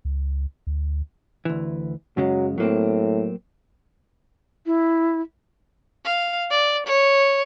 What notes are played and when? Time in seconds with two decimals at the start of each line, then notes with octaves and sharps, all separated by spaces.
0.05 C#2
0.67 D2
1.45 D2 E3
2.17 F#2 C#3 F#3 G#3
2.58 A2 F#3 A#3 C4
4.66 E4
6.05 F5
6.50 D5
6.86 C#5